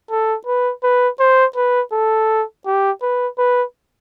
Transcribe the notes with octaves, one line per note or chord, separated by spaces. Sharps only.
A4
B4
B4
C5
B4
A4
G4
B4
B4